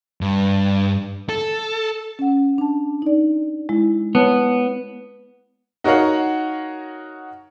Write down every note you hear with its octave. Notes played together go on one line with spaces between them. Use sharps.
G2
A4
C#4 F#5
D4 A5
D#4 D5
G#3 E4
B3 C#5 A5
D#4 F#4 A#4 C#5 F5 F#5